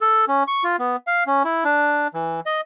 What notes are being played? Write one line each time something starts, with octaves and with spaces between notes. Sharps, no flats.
A4
C#4
C#6
F4
B3
F5
C#4
E4
D4
E3
D#5